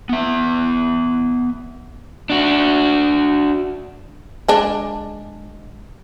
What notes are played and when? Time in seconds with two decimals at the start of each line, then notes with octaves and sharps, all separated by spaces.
0.09 B3 E5
2.30 D4 F#4
4.48 G#3 D4